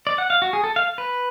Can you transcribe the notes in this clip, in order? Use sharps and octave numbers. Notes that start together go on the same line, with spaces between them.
D5
F#5
F5
F#4
G#4
A4
F5
B4